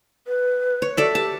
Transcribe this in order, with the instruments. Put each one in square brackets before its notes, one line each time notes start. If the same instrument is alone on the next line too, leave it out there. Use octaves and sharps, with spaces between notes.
[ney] B4
[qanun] C#5
[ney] F#4 [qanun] A4 D5 E5
[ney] G4 [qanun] A5